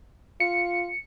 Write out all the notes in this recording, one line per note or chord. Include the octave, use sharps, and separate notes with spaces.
F4 C#7